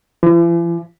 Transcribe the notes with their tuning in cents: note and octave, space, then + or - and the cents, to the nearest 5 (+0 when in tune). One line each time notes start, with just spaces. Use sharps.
E3 +45